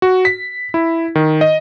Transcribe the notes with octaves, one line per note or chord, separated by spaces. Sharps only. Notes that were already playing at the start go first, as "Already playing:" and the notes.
F#4
B6
E4
D#3
D#5